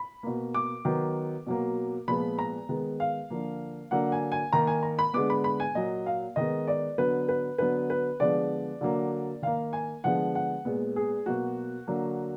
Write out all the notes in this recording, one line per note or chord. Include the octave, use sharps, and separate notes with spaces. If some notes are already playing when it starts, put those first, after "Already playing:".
Already playing: B5
B2 A#3
D6
D#3 F#3 B3
B2 F#3 A#3
A#2 F3 G#3 B3 B5
A#5
D#3 G#3 B3
F5
D3 F3 A#3
D3 F#3 A#3 F#5
G#5
G#5
D#3 A#3 A#5
G#5
A#5
B5
D3 G#3 B3 D6
B5
B5
G#5
A#2 F#3 A#3 D#5
F5
D#3 G#3 B3 D#5
D5
D3 F#3 B3 B4
B4
D3 F#3 B3 B4
B4
D3 F3 G#3 B3 D5
D3 F#3 A#3
D#3 A#3 F5
G#5
D3 F3 G#3 B3 F#5
F#5
A#2 G#3 B3
G#4
B2 F#3 A#3 F#4
D3 F#3 A#3